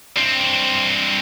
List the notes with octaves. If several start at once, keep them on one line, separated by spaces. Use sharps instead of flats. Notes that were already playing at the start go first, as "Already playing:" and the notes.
G2 C4